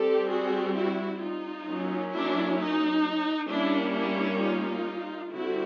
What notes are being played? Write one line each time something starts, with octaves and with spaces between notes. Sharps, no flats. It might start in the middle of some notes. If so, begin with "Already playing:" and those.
Already playing: G3 C4 G4 A4
F#4 G#4
E4 F#4
D#4 F4
F#3 A#3 C#4
D4 E4
D#4
G3 A#3 C#4 D4 E4
D4 E4
D#4 F4
D3 G3 C4 E4 F#4